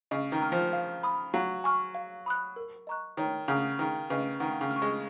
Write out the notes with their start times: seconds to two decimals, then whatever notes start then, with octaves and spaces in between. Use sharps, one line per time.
0.11 C#3 D#5
0.32 D#3
0.42 A#5 F6
0.52 F3
0.73 F5
1.03 B5 D#6
1.34 F#3 F5
1.64 G#5 C#6 F6
1.95 F5
2.26 B5 D#6 F#6
2.56 A#4
2.87 D#5 A#5 C#6 F#6
3.17 D#3 C#5
3.48 C#3 F#5 A#5 D#6
3.79 D#3 G#4
4.10 C#3 B4 D#5
4.40 D#3 F#5
4.61 C#3
4.71 F6
4.76 C#6
4.82 G#3